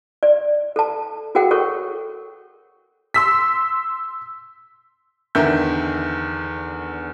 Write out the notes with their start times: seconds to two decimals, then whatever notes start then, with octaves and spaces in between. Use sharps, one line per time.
0.23 D5
0.76 A4 A5
1.35 F#4 G#4 A#4 F#5 G5
1.51 A4 A#4 C#5 C#6
3.14 C6 E6 B6
5.35 E2 D3 D#3 A#4 E5 G6